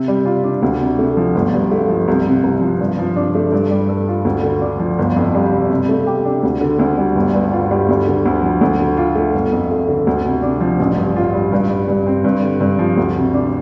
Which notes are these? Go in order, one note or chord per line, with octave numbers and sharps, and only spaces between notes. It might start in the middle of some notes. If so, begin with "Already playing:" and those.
Already playing: C3
G3
F4
D4
D2
C3
A3
F3
G1
G2
A3
F3
C2
C3
C2
F3
G2
F3
D4
A3
G2
G3
A4
F4
D2
D3
D4
F3
G1
F2
G3
C3
C3
A3
G4
D4
D2
D3
D2
G3
G1
G2
F4
G3
D2
D3
D2
F3
D2
D3
F4
A3
G1
F2
A3
D3
D2
C3
D4
F3
A1
G2
F4
G3
G2
G3
G2
C4
G2
D3
G2
F3
D2
C3
D4